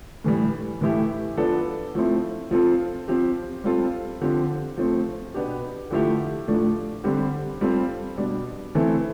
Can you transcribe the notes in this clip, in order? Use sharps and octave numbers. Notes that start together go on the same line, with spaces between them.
A2 E3 G3
A2 E3 A3 E4 G4
F3 B3 D4 A4
F3 A3 C4 E4
F3 C4 F4 A4
F3 C4 G4
G3 C4 F4 A4
D3 F3 C4 G4
F3 A3 C4
B2 B3 D4 G4
D3 F3 A3 E4 G4
A2 F3 A3 D4
D3 G3 C4 G4
G3 C4 F4 A4
B2 G3 D4
E3 A3 C4 E4 A4